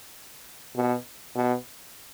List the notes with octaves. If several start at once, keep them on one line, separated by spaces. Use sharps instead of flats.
B2
B2